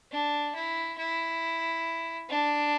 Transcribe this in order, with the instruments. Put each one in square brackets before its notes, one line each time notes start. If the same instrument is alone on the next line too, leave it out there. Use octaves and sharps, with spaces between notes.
[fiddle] D4
E4
E4
D4